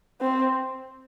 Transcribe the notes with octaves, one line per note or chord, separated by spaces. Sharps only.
C4